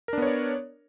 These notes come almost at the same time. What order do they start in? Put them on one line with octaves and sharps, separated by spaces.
A#4 D4 B3 C#5 D5